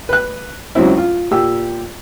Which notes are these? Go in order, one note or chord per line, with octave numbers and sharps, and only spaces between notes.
B4 F#6
C#2 F#3 C4 E4
F4
A#2 G4 E6